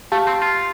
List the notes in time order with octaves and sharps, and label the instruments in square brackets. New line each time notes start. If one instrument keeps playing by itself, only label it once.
[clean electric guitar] A3 [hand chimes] G4 F5 A5
[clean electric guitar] C4
F4